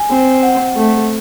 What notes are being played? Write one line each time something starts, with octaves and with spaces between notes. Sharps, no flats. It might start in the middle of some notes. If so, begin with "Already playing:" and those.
Already playing: G#5
C4
F#5
A3